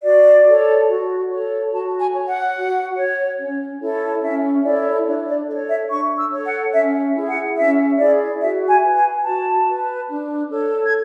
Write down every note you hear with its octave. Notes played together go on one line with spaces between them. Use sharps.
F#4 D5
A4 C#5
F#4
A4 C#5
F#4 A5
G#5
C#5
F#5
F#4
C#5
C#4
E4 A4 C#5
C#4 E5
E4 A4 C#5 D5
D4 C#5
D5
A4 C#5 D5
E5
D4 C#6
E6
A4 C#5
F#5
C#4 E5
E4 G#4
F#5
C#4 E5
E4 G#4 D5
F#4 E5
G#5
B4
G#5
F#4 A5
B4
D4
A4 C#5
G#6